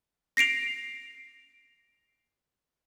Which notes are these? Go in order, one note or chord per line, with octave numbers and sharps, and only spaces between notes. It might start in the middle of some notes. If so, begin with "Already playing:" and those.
A#6 C7 D7 F7